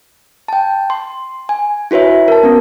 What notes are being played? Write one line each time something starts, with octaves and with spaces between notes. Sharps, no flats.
G5 A5
C6
G#5
E4 F#4 B4 C#5 E5
A#4 A5
B3 C#4